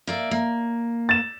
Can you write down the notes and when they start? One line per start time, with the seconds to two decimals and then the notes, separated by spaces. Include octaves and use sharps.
0.07 A#3 D5 E5
0.31 A#3
1.09 A6 E7